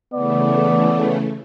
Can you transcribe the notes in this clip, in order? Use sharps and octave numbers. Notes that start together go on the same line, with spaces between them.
C#3 E3 A3 B3 D5